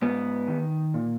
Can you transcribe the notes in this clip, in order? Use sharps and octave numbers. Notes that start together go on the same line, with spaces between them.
G#2 B3
D#3
A#2